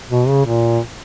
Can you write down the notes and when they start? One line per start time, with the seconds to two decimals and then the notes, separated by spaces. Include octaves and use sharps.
0.08 B2
0.28 C#3
0.46 A#2